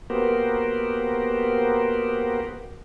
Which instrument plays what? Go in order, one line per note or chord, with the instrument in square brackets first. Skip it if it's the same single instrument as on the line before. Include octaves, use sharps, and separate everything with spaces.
[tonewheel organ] A#3 B3 F#4 G4 A#4 C5